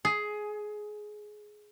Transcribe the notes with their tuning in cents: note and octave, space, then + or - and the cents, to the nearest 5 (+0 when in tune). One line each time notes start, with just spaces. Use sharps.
G#4 +15